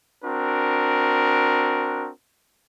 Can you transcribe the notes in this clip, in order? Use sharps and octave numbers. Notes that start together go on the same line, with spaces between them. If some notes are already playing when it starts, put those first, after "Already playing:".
C4 D4 F#4 A#4